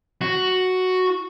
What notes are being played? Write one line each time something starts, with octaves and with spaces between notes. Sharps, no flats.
F#4